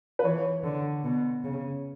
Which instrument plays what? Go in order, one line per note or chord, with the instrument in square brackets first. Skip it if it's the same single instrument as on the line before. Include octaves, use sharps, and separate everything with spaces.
[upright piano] B4
[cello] E3 [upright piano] C#5
[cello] D3
B2
C#3